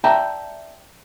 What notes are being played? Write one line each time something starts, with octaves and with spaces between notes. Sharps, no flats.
D5 E5 G5 A5 A#5